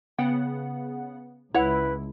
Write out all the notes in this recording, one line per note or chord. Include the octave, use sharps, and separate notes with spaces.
C#3 B3 F#5 G5
C#2 E4 B4 C#5 F#5